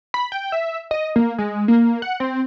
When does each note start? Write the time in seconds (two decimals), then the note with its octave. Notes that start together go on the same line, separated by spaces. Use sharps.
0.14 B5
0.32 G5
0.52 E5
0.91 D#5
1.16 A#3
1.38 G#3
1.68 A#3
2.02 F#5
2.20 C4